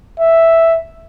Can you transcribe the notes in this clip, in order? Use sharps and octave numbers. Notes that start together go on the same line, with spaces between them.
E5